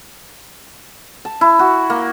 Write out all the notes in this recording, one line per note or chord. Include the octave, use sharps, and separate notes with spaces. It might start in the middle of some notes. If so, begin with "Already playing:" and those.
A5
E4
F#4
A#3